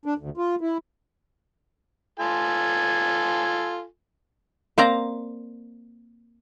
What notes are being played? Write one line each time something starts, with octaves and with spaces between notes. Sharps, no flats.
D4
D2
F4
E4
F4 A4 G#5
A#3 C4 C5 D5 F5 A#5